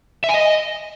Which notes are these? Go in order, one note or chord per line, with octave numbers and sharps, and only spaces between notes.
E5
G#5
D#5